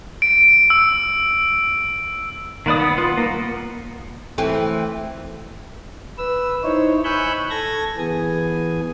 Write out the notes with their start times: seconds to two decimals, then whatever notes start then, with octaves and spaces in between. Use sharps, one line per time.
0.22 D7
0.70 E6
2.66 D#3 A#3 B4 D5 D#6
2.80 B3
2.98 F4 B4
3.18 A#3 B3
4.38 E3 A3 C4
6.18 B4 E6
6.64 D#4 E4 C5 C#5
7.04 G#5 B5 C#6 E6 F#6 G6
7.50 A4 G#6 A#6
7.98 E3 B3 G#4 G#5